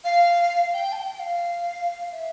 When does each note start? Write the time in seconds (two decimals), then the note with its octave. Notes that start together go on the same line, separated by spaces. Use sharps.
0.04 F5
0.74 G5
0.92 A5
0.97 G5
1.20 F5
2.12 E5